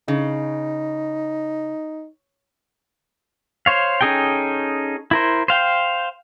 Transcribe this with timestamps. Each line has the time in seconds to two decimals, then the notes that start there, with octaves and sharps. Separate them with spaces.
0.08 C#3 D#4
3.66 C5 C#5 F5
4.01 C#4 D#4 G#4 A4 G5
5.11 E4 A#4 C5
5.48 C5 F5 G5